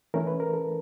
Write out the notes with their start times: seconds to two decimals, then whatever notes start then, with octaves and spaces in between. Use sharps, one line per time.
0.14 E3 A3 C#4 E4 A#4
0.27 B4
0.40 A#4
0.53 A4